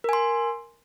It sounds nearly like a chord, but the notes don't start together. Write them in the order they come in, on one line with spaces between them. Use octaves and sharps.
A#4 G#5 C6